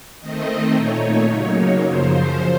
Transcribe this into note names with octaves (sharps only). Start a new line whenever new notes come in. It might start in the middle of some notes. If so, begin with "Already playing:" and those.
D#3 A3 C4 D#5
A#2 A3 D#4 C#5
C#3 F#3 A#3 D#4 C#5
F#2 C#3 F3 C5